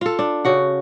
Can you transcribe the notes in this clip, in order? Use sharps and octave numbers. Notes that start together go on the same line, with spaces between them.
F4 A4
D4
C#3 F#4 F#5